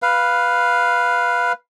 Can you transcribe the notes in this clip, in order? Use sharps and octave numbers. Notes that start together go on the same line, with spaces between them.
B4 F5